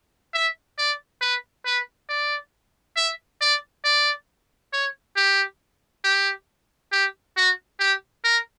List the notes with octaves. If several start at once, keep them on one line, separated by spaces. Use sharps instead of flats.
E5
D5
B4
B4
D5
E5
D5
D5
C#5
G4
G4
G4
F#4
G4
A#4